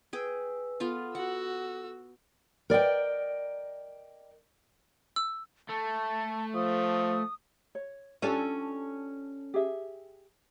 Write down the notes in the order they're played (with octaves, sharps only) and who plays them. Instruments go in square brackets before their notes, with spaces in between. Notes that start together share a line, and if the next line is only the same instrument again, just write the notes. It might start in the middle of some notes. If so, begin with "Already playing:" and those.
[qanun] G#4 G5 [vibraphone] B4 E6
[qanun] B3 F4 F5 [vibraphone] A4
[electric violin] F#4 E6 [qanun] F#5
[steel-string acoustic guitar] A#4 D5 D#5 G5
[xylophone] E6
[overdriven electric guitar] A3 [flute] A5
[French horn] F3 [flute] D#6
[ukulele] C#5
[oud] C#4 D4 A4 [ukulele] F4 G4 D5
[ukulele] G4 G#4 E5